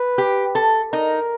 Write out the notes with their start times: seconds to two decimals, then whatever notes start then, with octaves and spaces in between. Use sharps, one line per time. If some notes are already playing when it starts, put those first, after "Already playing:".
Already playing: B4
0.18 G4
0.55 A4
0.92 D#4 A#4